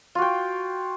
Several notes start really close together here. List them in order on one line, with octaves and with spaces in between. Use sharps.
F4 F#4 G5